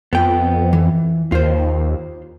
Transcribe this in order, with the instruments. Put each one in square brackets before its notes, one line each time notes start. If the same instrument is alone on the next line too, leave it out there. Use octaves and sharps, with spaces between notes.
[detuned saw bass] F2 [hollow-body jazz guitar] B3 G5
[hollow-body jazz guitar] E3
[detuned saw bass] D#2 [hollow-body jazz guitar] F4 C5